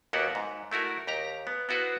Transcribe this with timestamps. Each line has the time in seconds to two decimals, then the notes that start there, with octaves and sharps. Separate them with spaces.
0.13 D#2 A#3 B3 F#4 G4 F#5
0.35 G#2
0.71 A3 E4 F#4 A#4
1.07 D#2 G4 A#5
1.47 B3
1.69 B3 E4 F#4 B4 C5